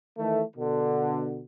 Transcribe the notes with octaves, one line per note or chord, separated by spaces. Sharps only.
D#3 E3 A3
B2 D3